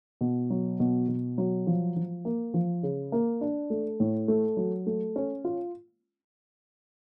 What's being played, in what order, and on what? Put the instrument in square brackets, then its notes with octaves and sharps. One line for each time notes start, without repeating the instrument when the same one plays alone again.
[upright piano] B2
F#3
B2
B2
F#3
F3
F3
A#3
F3
C#3
A#3
D4
A3
A2
A3
F#3
A3
C#4
F4